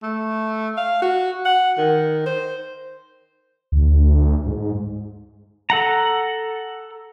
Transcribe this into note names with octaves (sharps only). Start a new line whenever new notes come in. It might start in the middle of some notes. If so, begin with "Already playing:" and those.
A3
F5
F#4
F#5
D#3
C5
D2
G#2
A4 F#5 A#5